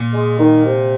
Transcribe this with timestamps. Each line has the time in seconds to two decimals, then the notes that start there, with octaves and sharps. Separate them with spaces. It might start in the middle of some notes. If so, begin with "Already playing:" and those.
Already playing: A#2
0.13 G#3
0.39 D#3
0.64 C3